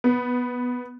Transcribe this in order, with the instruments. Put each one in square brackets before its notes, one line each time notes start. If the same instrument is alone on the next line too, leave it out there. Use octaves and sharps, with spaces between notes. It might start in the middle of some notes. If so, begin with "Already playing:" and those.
[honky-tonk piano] B3